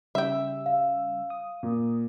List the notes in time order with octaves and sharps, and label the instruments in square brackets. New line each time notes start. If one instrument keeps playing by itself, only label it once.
[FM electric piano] C#3 G3 E6 [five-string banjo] E5 G5
[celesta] F5
[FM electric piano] D#6
[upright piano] A#2